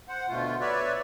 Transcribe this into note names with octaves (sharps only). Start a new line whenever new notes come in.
C5 F#5
B2 D3 A3 F4
B4 C#5 D5 E5